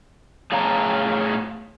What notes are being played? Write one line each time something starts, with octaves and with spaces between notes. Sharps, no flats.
A2 G#4 C#5 F5 A5 A#5